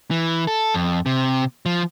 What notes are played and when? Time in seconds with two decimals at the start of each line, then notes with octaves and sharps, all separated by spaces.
0.11 E3
0.47 A4
0.74 F2
1.06 C3
1.66 F3